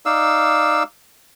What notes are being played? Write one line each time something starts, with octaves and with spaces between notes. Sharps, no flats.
D#4 D5 F5 E6